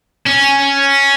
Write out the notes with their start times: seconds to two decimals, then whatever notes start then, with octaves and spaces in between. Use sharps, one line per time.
0.26 C#4